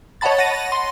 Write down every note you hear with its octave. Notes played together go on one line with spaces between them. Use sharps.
C#5 D#5 F#5 A5 B5 A6
F#5 A6 A#6 D#7
C6